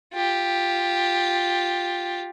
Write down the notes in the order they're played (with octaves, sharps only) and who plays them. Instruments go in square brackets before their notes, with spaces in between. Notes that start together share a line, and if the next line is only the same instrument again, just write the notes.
[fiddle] F4 G4